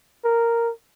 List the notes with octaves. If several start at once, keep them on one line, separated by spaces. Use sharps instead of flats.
A#4